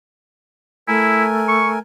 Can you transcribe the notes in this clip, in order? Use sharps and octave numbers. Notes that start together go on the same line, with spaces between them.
A3 E4 A#4 G#5
C#6